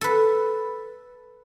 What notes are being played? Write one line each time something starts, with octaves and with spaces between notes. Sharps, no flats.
A4 B4